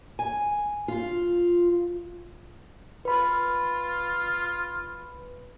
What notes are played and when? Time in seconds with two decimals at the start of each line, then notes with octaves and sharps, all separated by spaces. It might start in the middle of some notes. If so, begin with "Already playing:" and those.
0.19 G#5
0.88 F4
3.05 F4 B4 B5